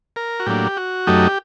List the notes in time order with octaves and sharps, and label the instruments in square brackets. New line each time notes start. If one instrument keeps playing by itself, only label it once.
[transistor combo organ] A#4
F#4
A2 F#3 A#3 D4 G4
F#4
F#2 F#3 A3 D#4 G4